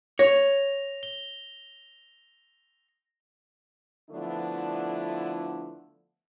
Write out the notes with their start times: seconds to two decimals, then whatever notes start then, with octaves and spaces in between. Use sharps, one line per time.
0.19 C#5 A#6 F7
1.03 G7
4.10 D3 F3 A3 B3 D4 E4